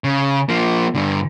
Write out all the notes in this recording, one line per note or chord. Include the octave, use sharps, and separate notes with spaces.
C#3
F3 A#3
G2 D3